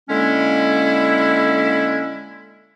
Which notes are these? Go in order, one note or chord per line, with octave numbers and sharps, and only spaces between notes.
D3 G#3 A#3 C#4 E4